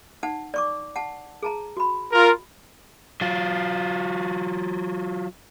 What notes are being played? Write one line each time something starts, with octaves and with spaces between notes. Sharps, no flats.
D#4 F#5 A5
D5 C#6 D6
F#5 A5
G#4 A5 A#5
F#4 B5
F4 A#4
F#3 F4